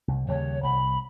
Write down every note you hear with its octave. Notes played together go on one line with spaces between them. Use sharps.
C2
D#2 C#3 G3 C#5
C2 B5